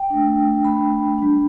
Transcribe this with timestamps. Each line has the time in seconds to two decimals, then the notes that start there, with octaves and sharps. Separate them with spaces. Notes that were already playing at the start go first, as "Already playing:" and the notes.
Already playing: G5
0.10 A3 D4
0.65 B5
1.18 G3 D4